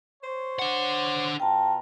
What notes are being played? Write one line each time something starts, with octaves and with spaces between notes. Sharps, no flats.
C5 C#5
D4 F#5
B2 F4 G5 A5 A#5